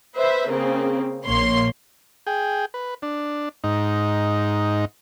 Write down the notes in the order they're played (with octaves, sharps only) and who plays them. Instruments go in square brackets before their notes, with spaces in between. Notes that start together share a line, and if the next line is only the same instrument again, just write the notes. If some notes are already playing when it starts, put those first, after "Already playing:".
[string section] B4 C5 E5
C#3 A#3 C4
A#1 A#3 C#5 C6
[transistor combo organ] G#4 G5
B4
D4
G#2 D#4